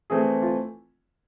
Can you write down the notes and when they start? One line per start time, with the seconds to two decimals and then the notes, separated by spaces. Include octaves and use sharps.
0.10 E3 A3 C4 G#4
0.42 F4